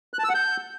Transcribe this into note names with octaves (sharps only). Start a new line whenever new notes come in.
F#6
A5
E6
F#5
G6